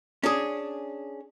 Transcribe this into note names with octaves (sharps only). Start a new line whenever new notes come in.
C#4 D4 G#4